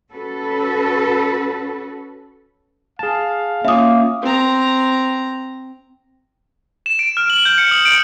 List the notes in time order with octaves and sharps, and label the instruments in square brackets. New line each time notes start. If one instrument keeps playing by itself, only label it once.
[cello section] C#4 F#4 A4 B4
[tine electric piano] G#4 A5 [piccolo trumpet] F5
[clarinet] A#3 [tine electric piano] C#4 F4 [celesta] E5 D#6
[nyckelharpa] C4 A#5
[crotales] E7
D7
F6
F#7
G6
C#7
D#6
D7